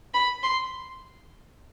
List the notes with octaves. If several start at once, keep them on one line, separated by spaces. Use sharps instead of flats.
B5
C6